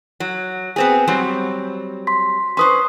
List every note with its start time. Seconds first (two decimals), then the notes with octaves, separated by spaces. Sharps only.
0.20 F#3
0.76 B3 C4 G#4
1.07 F#3 G3 C4
2.07 C6 B6
2.57 C#4 B4 C5 C6 D#6